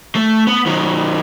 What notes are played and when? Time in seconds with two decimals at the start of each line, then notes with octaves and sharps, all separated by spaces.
0.15 A3
0.47 B3
0.66 D#3 F#3